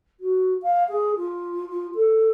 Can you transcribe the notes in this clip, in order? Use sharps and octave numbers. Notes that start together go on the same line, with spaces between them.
F#4
F5
G#4
F4
F4
A4